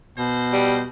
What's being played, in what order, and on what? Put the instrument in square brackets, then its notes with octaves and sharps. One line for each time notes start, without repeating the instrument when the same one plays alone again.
[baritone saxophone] B2 [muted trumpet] C5
[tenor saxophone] G3